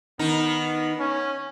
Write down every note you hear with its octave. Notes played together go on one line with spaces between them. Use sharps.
D#3 B3 D#4
C#4